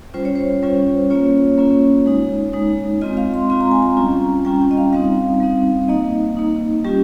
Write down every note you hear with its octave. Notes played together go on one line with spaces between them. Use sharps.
G3 C#4 F4 C5
C#5
C5
G3 C#4 F4
A#3 C#4 F4 C#5
A#3 C#4 F4
G#3 D#4
G#3 D#4
G#3 C4 F4 D#5
F5
C6
G#3 C4 F4 C6
A#5
G#5
A#5
G3 C#4 F4
G3 C#4 F4 G5
G5
D#5
F5
G3 C4 D#4 F5
G3 C4 D#4
A#3 D#4 D#5
A#3 D#4
G3 C#4 F4 G4